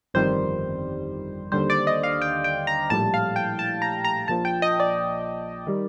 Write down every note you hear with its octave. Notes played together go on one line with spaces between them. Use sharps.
G1 F2 D#3 G3 C5
D#2 D3 G3 C5
D5
D#5
F5
G5
G5
A#5
A#1 A2 G3 A5
F5
G5
A5
A#5
A#5
A#1 A#2 F3 A5
G5
D#5
D5
D#3 G3